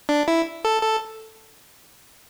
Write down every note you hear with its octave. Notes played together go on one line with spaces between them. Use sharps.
D4
E4
A4
A4